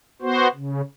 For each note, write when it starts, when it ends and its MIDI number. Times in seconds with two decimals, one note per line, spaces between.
0.22 0.48 59
0.22 0.48 66
0.22 0.48 72
0.55 0.81 49